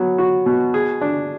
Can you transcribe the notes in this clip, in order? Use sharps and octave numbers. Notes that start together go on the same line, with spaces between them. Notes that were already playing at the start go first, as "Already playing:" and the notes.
Already playing: F#3 B3
F#4
B2
G#4
D4